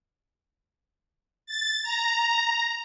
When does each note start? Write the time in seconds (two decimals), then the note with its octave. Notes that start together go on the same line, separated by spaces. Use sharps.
1.46 A6
1.83 A#5